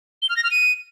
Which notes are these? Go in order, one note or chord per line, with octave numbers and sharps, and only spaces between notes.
G7
F6
A#6
F6
D#7